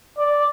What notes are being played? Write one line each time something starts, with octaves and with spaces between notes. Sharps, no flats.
D5